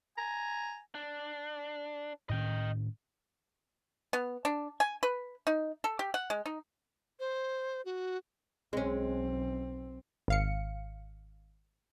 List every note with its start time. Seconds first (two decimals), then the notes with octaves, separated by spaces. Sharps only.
0.18 G#5 A#5
0.95 D4
2.29 A2 D#3 C#4 D#5 G5
4.13 B3
4.45 D4
4.80 G#5
5.03 B4
5.47 D#4
5.84 A4
5.99 G4
6.14 F#5
6.30 G#3
6.46 D#4
7.19 C5
7.85 F#4
8.73 B1 G#3 C4 C#4
10.28 G#1 F5 C#7